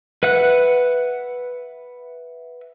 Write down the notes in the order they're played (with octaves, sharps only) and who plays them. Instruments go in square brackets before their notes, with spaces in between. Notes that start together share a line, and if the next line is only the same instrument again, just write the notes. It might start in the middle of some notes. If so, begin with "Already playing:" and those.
[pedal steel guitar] B4 E5 F#5 F#6